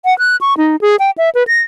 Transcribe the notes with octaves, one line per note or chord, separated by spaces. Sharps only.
F#5
F#6
C#6
D#4
G#4
G5
E5
B4
A#6